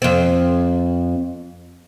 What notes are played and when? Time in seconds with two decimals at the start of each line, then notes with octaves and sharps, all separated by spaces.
0.02 F2 C4